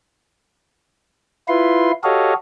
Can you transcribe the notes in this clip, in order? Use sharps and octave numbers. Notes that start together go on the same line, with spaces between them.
E4 F4 B4 C6
F#4 G4 A4 C#5 D#5 F5